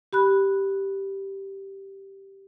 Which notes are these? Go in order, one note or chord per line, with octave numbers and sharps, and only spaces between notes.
G4 B5 F#6